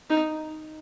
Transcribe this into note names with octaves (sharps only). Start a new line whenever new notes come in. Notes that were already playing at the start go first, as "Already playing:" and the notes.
D#4